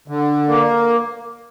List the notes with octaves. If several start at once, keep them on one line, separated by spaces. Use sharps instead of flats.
D3
A#3